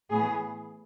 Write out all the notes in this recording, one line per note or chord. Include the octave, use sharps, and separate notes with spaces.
A2 E3 B3 G#4